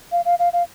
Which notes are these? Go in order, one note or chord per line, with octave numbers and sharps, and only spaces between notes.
F5
F5
F5
F5